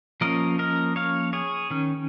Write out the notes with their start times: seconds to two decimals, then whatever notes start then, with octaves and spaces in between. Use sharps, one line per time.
0.21 F3 A#3 C#4 A#4 D#5
0.59 A#4 D#5
0.96 C#5 F5
1.33 G#4 C#5
1.70 D#3 C#4